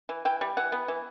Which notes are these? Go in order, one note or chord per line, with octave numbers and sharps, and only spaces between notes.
E3
E3 G5
G3
E3 F#5
B3
E3